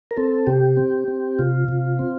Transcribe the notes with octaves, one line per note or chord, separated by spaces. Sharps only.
A#4
C4 A4
C3 G4
C4
C4
C3 F4
C3
C4